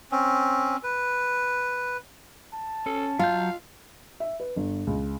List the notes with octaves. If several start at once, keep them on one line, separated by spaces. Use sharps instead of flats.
C4 C#4
B4
A5
C#4 A4
F#3 F4 F5 G6
E5
B4
G1
C#2